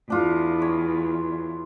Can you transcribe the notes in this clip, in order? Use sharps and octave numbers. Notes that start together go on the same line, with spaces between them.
E2 D4 F4
C#5